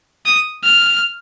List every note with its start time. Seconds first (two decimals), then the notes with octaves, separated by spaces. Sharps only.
0.26 D#6
0.64 F6